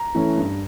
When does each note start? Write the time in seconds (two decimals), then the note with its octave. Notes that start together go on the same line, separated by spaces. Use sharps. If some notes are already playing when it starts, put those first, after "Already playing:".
Already playing: A#5
0.15 E3 A3 C#4
0.37 G2